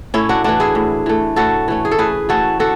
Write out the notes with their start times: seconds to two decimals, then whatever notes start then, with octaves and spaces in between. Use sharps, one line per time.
0.14 A2 C#4 E4
0.29 D4 F#4
0.44 E3 A3 D4 F#4
0.60 E4 G#4
0.75 A2
1.06 E3 A3
1.36 A2 F#4 A4
1.68 E3 A3 C#4
1.85 G#4
1.92 A4
1.98 A2 G#4 B4
2.29 E3 A3 C#4 F#4 A4
2.59 D3 F#4 A4